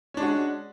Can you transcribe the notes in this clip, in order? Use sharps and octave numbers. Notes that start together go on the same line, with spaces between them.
G#3 C#4 D4 F#4